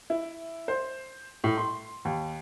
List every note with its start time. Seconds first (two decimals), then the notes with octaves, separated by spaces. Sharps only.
0.10 E4
0.68 C5
1.44 A2
1.57 C6
2.05 D#2